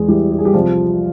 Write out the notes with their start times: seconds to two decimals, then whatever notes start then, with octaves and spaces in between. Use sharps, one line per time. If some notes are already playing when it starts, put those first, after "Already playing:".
Already playing: E2 G#3 G#4
0.08 E3 G3 G4
0.31 G4
0.39 G#4
0.45 G3 G4
0.54 C2 F3 F4